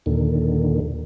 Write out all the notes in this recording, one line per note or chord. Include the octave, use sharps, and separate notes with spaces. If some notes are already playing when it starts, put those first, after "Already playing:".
D#2 A#2 D3 D#3